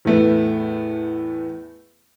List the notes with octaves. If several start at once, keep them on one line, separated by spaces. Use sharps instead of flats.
E2 A2 A3 B3